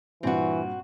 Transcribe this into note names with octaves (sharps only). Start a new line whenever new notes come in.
G2 A#2 E3 C4 F#4